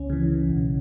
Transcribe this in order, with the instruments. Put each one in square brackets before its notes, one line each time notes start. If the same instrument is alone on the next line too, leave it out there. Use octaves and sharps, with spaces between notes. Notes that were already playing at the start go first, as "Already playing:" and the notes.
Already playing: [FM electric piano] C#2 C#4
C#3 E3
B1